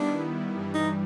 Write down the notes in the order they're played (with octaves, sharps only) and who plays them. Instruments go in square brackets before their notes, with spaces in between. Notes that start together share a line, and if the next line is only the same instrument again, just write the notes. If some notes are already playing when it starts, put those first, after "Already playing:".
Already playing: [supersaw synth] D#3 G3 B3 E4 [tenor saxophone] D4
[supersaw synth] G2 E3 G3
[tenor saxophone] D#4